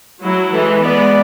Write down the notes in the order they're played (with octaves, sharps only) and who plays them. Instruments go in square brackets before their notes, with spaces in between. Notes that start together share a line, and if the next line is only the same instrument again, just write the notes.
[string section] F#3 [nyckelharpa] E4
[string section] E3 G#3 [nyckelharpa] A4
[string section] G#3 B3 [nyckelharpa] D5